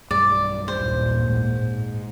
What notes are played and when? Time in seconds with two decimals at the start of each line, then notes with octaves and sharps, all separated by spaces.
0.11 B1 G2 D5
0.68 A1 D#2 A#2 C5
1.24 G#2 G#3